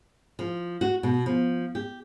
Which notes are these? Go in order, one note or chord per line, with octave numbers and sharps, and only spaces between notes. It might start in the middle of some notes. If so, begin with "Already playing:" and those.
F3
F#4
B2
F3
G4